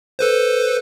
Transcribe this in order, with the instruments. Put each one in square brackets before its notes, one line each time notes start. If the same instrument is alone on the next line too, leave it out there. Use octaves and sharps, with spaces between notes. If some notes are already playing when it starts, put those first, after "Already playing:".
[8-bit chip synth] A4 B4 C5